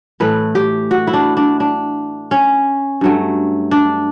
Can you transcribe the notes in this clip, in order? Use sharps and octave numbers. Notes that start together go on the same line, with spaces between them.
A2 E3 A3 B4
G4
F#4
E4
D4
D4
D4
C#4
G2 F#3 A3
D4